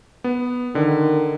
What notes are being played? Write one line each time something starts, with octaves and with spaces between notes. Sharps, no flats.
B3
D3 D#3